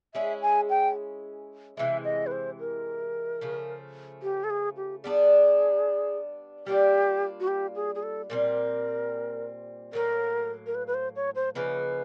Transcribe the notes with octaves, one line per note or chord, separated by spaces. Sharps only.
G#3 C#4 E4 G#4 E5
G#5
G5
C3 E3 G#3 E5
D#5
B4
C5
A#4
C#3 F3 A3
G4
A4
G#4
G4
G3 B3 D4 G#4
G3 A#3 D4 F4 G4
F#4
G4
G#4
G#4
A4
A#2 G3 C4 A#4
A2 F#3 A#3 A#4
A#4
B4
B4
C5
C#5
C5
C#3 F3 A#3 D#4 B4